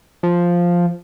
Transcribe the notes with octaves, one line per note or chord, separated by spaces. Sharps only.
F3